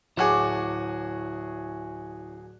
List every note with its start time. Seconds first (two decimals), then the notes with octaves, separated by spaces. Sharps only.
0.17 D1 E4 F#4 G#4 C#5 D5